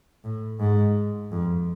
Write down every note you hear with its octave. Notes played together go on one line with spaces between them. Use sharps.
A2
G#2
F2